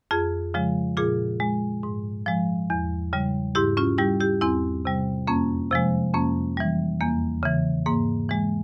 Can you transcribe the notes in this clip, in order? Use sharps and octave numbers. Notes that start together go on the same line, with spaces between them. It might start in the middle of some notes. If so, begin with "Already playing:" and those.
F2 F4 G#4
C#3 F3 G#3
A#2 F4 G#4
G#3
G#2
F3 G#3
E2
C#3 G3
G#2 E4 G4
C#4 F4
G3 E4 G4
E4 G4
E2 C4 E4
C3 G3
F2 A#3 C#4
C3 F3 G#3
F2 A#3 C#4
E3 G3
E2 A#3
C#3 E3
G#2 A#3
E3 G#3